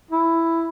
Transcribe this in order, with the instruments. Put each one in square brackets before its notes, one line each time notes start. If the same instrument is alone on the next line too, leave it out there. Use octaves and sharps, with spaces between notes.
[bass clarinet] E4